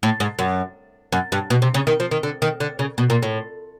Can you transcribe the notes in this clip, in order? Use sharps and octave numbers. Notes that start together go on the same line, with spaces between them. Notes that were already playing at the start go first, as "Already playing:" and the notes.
A2
G#2
F#2
F#2
G2
B2
C3
C#3
D#3
F3
D#3
D3
D#3
D3
C#3
B2
A#2
A2